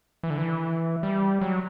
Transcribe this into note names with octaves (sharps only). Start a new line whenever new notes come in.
E3
D3
E3
G3
F#3